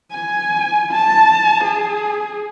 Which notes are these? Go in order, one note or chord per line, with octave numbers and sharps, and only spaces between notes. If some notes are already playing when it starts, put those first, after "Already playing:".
G#5
A5
G#4